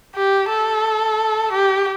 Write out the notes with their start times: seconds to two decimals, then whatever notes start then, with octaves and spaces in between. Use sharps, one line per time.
0.15 G4
0.49 A4
1.52 G4